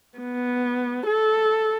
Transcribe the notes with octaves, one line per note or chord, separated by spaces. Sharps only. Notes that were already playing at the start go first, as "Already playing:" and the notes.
B3
A4